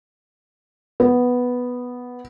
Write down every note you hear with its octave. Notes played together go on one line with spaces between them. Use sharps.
B3